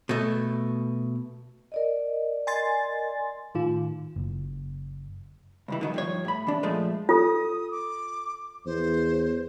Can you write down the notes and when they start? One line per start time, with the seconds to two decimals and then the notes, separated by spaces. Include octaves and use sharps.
0.09 B2 A3
1.72 A#4 D5 D#5
2.47 G#5 C6 A6
3.55 A2 D#3 F4
4.16 F#1
5.68 C#2 G2 E3
5.81 D3 D#3 F#3
5.94 G2 F3 C#5
6.25 A2 B5
6.47 E3 D4
6.63 A#2 F3 G#3 A3
7.09 F4 A4 D#6
7.71 D6
8.66 E2 C5